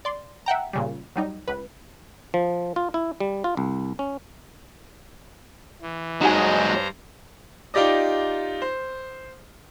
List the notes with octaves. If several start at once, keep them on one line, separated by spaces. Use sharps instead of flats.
D5 C6
E5 F#5 G5 A#5
A#2 C#3 G3
F#3 G3 D#4
C#2 B4
F3
F4
E4
G3
F4
C2
C#4
E3
G2 F#3 G#3 D#4 F#4 C5 G#5 A#5
D#4 F4 G4 D5 D#5
C5